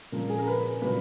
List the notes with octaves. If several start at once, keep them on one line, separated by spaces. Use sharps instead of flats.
A#2 F3 G#3 A#4
G#4
A#4
B4
A#2 F#3 A#3 B4